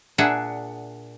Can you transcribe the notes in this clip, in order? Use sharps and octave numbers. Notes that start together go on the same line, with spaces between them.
A#2 D4 G#4 E5 F#5